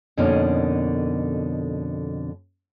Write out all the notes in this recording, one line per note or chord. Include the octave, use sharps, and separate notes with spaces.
F2 B2 D3 A#3 C#4 D#4